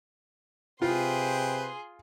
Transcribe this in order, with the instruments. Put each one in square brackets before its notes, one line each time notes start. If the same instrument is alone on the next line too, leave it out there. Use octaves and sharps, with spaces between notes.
[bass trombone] C3 [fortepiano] F4 [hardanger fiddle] G#4 C6 [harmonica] B4 C5 G5